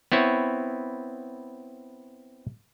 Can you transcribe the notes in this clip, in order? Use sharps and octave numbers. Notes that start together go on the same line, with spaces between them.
B3 C4 E4 C#5